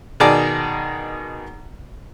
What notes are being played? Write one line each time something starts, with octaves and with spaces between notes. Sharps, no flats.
B2 D#3 G#4 D5 A5 D6